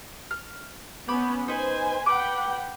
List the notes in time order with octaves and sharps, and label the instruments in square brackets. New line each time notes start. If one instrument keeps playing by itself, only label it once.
[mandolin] F6
[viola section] B3 C#4 [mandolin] B5 D6 G6
[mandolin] D#4 B4 [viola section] C5 G#5
[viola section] B4 F#5 G5 [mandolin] D6